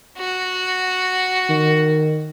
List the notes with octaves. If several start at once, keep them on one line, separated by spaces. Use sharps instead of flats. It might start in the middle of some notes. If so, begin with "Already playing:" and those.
F#4
D#3